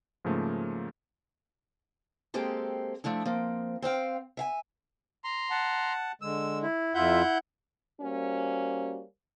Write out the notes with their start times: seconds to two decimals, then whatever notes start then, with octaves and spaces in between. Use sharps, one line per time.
0.25 G#2 C#3 F3 A3 A#3
2.34 G#3 A#3 C4 G4 A4
3.04 F3 A3 D4 E4
3.25 F3 A#3 C4
3.82 C4 C5 F5 G5
4.37 E5 F5 G#5
5.24 A#5 C6
5.51 F#5 A5
6.22 D3 G#3 E6
6.63 E4
6.95 F2 E4 F4 E5 F#5 G6
8.01 G3 A#3 C#4 F#4 C5